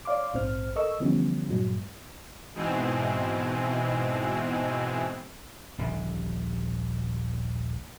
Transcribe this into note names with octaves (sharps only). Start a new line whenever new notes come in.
C#5 D5 F5 C6 D6
A#1 G#2 C4 C5 F6
A4 A#4 D#5 C#6 E6
D3 E3 F3 G3 B3 C#4
G2 A#2 F#3 G#3
G#2 B2 E3 G#3 C4
D#1 A#1 D3